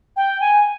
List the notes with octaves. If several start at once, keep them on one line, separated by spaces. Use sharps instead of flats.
G5
G#5